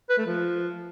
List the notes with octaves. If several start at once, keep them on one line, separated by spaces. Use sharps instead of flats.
B4
A3
F3